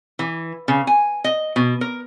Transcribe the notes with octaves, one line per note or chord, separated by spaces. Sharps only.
E3
C#3
G#5
D#5
B2
A#4